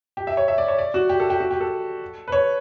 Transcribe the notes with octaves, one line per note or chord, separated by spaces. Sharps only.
G4
E5
C#5
E5
D5
C#5
D5
F#4
G4
A4
G4
F#4
G4
A4
B4
C#5